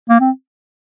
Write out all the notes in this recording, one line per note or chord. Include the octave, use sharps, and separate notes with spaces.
A#3
C4